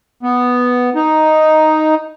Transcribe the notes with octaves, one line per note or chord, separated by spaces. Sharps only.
B3
D#4